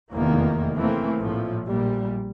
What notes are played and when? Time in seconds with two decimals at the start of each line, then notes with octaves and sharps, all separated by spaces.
0.12 F1 E2 D#3 A#3
0.75 E3 A3 A#3 C4
1.20 A#1 A2 F3
1.67 A#1 A#2 G3